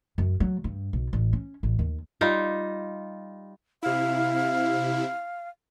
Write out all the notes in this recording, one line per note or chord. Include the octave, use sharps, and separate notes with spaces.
F#2
F#3
G2
B1
A1
C#4
A1
D#2
G3 D#4 F4
C3 E4 F5